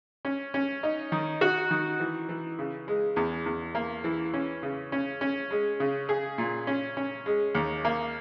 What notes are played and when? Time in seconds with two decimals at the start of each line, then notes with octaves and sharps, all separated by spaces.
0.25 C#4
0.54 C#4
0.83 D#4
1.12 D#3
1.41 F#4
1.71 D#3
2.00 E3
2.29 E3
2.59 C#3
2.88 G#3
3.16 E2
3.46 E2
3.75 A#3
4.04 E3
4.34 C#4
4.63 C#3
4.92 C#4
5.21 C#4
5.51 G#3
5.80 C#3
6.09 G#4
6.38 A#2
6.67 C#4
6.97 C#4
7.26 G#3
7.55 D#2
7.85 A#3